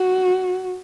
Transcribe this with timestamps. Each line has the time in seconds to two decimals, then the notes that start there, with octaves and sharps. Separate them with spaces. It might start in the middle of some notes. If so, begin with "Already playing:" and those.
Already playing: F#4